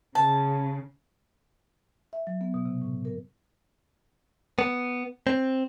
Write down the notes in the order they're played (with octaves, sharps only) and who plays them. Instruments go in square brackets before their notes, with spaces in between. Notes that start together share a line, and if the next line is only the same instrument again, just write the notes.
[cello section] C#3 [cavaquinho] A5
[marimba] E5
F#3
B3
B2
C3
A2
A#4
[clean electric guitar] B3
C4